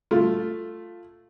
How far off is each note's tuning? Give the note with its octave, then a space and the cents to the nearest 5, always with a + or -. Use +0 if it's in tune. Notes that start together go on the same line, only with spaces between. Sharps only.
A3 +0 F4 +0